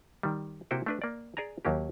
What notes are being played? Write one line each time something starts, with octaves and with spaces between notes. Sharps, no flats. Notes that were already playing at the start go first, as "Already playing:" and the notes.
D#3 G3
C3 A#3 E4 F#4 C5 G5
A3 D4 B4
A#3 D5
G#4 D5 G#5 A#5
D#2 F#3 A#3 G4